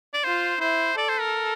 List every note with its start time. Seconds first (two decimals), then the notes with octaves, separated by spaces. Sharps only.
0.13 D5
0.24 F4 C5
0.60 E4 C5
0.97 A4 D5
1.09 C5
1.21 A#4